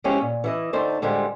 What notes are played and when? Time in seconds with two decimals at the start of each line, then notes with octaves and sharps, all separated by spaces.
0.04 F3 G#3 C4 C#4 E4 G4
0.21 A#2
0.44 E3 E4 D#5
0.73 D2 A3 D#4 C5 D5
1.02 A2 D3 G3 G#3 F4 C5